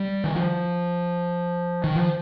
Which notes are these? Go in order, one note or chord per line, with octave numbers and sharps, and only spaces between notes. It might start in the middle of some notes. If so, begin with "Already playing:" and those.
Already playing: G3
D#3
F3
D#3
F3